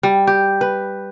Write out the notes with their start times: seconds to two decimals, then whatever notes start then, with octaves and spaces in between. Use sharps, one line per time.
0.03 G3
0.27 G4
0.61 B4